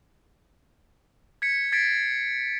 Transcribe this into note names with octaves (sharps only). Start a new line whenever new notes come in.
G#6 B6 C#7
G#6 A6 B6 C7 D7